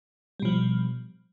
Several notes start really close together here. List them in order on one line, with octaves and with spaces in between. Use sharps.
G3 B2 F3